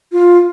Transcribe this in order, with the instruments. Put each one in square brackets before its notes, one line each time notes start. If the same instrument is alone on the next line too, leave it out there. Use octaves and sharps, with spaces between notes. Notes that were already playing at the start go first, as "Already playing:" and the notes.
[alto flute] F4